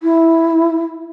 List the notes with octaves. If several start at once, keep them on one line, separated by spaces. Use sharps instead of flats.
E4